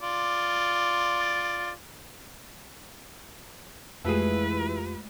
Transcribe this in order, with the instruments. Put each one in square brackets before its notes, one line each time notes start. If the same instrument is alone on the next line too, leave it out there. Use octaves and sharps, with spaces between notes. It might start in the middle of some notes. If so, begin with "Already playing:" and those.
[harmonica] F4 D5
[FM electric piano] F2 F4 G4 [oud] E3 G#4 [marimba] G#3 A3 [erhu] B4